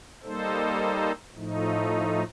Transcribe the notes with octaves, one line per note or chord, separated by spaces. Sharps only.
G3 A#3 D#4 A4 C5
A2 F3 A3 D#4